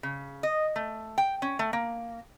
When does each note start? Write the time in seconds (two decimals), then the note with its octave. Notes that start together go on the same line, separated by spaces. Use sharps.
0.03 C#3
0.43 D#5
0.76 A3
1.18 G5
1.42 C#4
1.59 A3
1.73 A#3